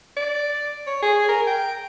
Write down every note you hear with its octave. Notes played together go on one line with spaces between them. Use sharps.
D5
C#5
G#4
A#4
G5